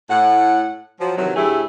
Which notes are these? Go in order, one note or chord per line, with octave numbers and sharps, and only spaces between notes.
A2 F#5
F3 F#3
C3 D#3 E3 F#3
D2 A2 A3 E4 G4 G#4